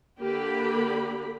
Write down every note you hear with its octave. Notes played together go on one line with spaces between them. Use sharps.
D3 A#3 G4 B5